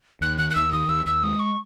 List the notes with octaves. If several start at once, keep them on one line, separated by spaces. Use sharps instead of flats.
D#2 F#6
D#3 F#6
F#6
D#2 E6
D#3 D#6
D#2 E6
D#2 E6
G#3 D#6
C#6